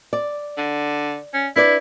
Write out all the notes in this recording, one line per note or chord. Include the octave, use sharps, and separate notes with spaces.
D5
D3
C#4
D4 E4 B4 D5